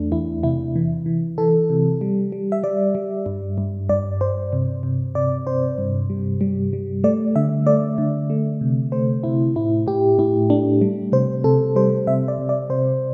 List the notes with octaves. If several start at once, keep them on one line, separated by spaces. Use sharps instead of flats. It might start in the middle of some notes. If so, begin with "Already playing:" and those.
Already playing: E2 A3 D4
E2 E4
C3 E4
E3
E3
E3 A4
C3
G3
G3
E5
G3 D5
G3
G2
G2
G2 D5
G2 C5
C3
C3
C3 D5
C3 C5
G2
G3
G3
G3
A3 D5
D3 E5
A3 D5
D3
A3
C3
A3 C5
C3 E4
A2 E4
A2 G4
A2 E4
A3 D4
G3
C3 C5
C3 A4
G3 C5
C3 E5
D5
C3
D5
C3 C5